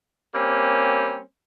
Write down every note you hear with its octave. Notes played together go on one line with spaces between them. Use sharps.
G3 A#3 C4 C#4